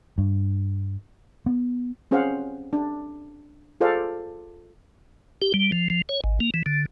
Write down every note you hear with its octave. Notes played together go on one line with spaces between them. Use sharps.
G2
B3
C4 C#4 G#4 C5 F5 F#5
D4
F4 G#4 A4 C5 D5 F5
G4
G3
F3
F3
C#5
G#1
A#3
E3
D3